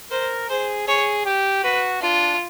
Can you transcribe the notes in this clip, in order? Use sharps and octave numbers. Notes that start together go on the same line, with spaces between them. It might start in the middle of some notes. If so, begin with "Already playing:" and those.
A#4 C5
G#4 C5
G#4 C#5
G4
F#4 B4
D4 F4